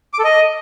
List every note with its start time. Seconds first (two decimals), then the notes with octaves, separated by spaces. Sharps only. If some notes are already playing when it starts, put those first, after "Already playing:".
0.13 D6
0.19 A4
0.24 D#5